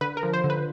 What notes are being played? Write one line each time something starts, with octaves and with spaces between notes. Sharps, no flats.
D3 B4
A#4
F3
C5
D3
B4